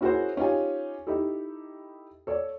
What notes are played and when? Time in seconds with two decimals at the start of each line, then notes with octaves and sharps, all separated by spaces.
0.01 C#4 E4 F#4 G#4 A#4 C5
0.37 C#4 D#4 F4 G4 G#5
1.07 D#4 E4 G4 A4
2.27 A4 C#5 D5